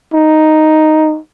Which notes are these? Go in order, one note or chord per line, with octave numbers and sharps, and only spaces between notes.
D#4